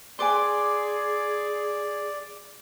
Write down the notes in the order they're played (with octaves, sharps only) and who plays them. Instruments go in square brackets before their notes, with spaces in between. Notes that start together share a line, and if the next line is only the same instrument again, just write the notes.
[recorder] G#4 [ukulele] B4 G#5 [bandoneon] D5 [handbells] C6 D6